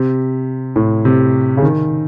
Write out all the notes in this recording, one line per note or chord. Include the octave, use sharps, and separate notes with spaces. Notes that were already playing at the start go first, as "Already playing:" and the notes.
Already playing: C3
A2
C3
C#3
D#3